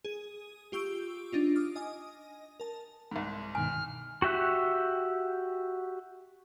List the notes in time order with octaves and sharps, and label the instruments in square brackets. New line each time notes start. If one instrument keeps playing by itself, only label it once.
[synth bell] G#4 D#7
F4 G4 C#6 E6 G6 D7
D4 D#4 F4
D6 D#6 F6
D#5 G#5 D#6
A#4 A5
[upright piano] C2 G#2
[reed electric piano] G2 B2 D#3 [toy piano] G#5 [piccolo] F6
[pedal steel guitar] F#4 G4 E5 F#6